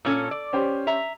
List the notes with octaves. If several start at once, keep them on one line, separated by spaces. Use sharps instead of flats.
A#2 C#4 A4
D5
C#4 G4 C5
E5 A#5